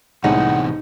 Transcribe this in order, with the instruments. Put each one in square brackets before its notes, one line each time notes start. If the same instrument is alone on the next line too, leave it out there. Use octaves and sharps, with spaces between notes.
[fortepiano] C2 A2 G#3 [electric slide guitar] C3 E3 B3 [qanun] D#4 [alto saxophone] F#5